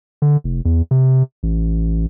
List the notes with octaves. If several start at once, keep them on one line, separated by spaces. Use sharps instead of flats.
D3
F1
E2
C3
A1